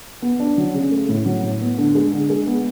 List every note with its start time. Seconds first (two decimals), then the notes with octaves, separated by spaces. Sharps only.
0.22 B3
0.40 D4
0.58 F#3
0.74 C#3
0.91 A3
1.09 A2
1.26 F#3
1.44 A2
1.61 B3
1.78 D3
1.95 G#3
2.12 D3
2.30 G#3
2.47 B3